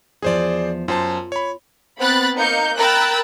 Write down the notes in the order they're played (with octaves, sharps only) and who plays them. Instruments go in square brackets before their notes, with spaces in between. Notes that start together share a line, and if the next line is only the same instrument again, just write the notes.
[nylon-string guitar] E2 F3 [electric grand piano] G#4 C5 D5
[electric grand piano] F#2 C5 A5 [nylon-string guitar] F4
[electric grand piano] C#5 B5
[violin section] B3 C4 B5 F#6 A6
A#3 D#4 F5 G6 C#7
A#4 G5 B5 E6 F#6 A6